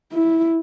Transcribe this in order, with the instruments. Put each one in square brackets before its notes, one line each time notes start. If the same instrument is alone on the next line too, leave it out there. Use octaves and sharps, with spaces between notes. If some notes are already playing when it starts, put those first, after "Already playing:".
[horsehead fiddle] E4